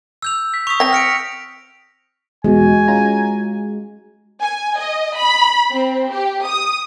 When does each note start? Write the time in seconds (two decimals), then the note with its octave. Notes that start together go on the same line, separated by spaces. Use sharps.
0.22 E6 G6 F7
0.54 B6
0.67 C#6 D#6 B6 F7
0.80 C4 G5 A#6
0.93 F6 C#7 D7
2.44 E2 B2 G#3 F#4 G#5
2.88 C#4 F4 A#5
4.43 G#5
4.79 D#5
5.17 B5
5.71 C4
6.11 G4
6.45 D#6